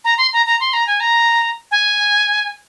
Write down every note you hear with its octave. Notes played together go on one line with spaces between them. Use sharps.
A#5
C6
A#5
A#5
C6
A#5
G#5
A#5
G#5